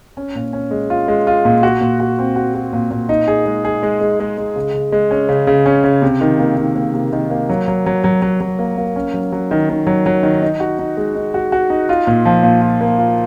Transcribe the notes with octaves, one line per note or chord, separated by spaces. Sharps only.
C#4
A#2
C#4
G#3
F4
G#3
F4
A#2
F#4
A#2
F#4
C4
F#4
F#4
A#2
A#2
D#4
G#4
G#3
G#4
G#3
G#3
G#3
G#3
C#3
C#3
G#3
C#4
C#3
C#3
C#4
C#3
C3
D#3
A#3
D#3
A#3
C3
D#3
A#3
F#3
F#3
F#3
F#3
F#3
F#3
A#3
A#3
C#4
F#3
F#3
D#3
D#3
F#3
F#3
D#3
D#4
F#4
D#4
G#3
D#4
F#4
F#4
D#4
F4
A#2
F3
A#2
F4
A#3
F4